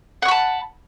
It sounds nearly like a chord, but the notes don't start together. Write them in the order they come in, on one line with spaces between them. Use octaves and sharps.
F#5 C#6 B5 A5